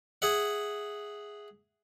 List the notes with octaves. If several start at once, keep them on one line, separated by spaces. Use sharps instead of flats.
G#4 E5 F#5